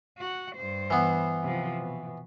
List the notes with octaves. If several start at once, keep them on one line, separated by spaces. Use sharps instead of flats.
F#4 F#5
G2 C5
E3 B3
C3 F3
B2